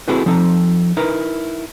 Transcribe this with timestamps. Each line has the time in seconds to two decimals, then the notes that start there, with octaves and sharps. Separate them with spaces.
0.08 C4 E4 F#4 G#4 A4 B4
0.26 F3 C4 D#4 A4
0.97 D#4 E4 A#4 B4